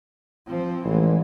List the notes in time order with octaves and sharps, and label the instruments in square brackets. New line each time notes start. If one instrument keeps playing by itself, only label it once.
[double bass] F3 C4
[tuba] A1 [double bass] E3 G#3